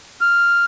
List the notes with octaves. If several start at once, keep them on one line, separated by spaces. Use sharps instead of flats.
F6